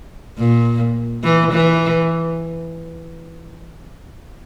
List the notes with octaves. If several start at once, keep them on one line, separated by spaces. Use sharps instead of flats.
A#2
E3
E3